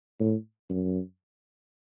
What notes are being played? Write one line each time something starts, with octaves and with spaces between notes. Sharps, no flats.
A2
F#2